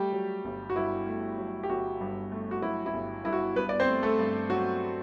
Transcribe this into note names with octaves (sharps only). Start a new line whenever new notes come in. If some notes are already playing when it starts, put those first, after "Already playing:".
Already playing: G3 A3 G4
F#3
G1
F#4
G2 E4
A3
F#3
G4
G1 F#4
G2
A3
F#4
F#3 E4
E4
G1
G2 E4
F#4
G2 B3 B4
D5
C4 C5
A3
A3 A4
G2
F#3 F#4